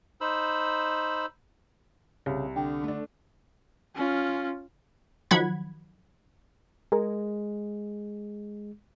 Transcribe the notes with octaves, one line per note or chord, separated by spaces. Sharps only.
D#4 C5 B5 E6
C2 C#3
D3 G5
A3 D4
C#4 F4
D#3 F3 F#3 F#5 B5 G#6
G#3 G#4 A#4